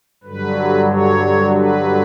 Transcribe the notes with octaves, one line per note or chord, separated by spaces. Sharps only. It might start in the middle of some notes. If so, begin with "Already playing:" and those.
G2 D3 F#3 B4
C#5
B4